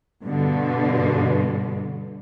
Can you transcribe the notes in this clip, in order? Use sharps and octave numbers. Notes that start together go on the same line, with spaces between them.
G2 B2 D3